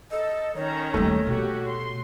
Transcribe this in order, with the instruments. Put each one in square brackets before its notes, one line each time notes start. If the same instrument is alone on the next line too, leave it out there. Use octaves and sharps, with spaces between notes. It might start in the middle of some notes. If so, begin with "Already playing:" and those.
[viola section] A4 [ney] D#5
[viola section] D#3 C#4 A#5 [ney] C#5
[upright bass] D#2 G3 [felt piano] A3
[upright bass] B2 [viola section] F#4 G4
[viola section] C6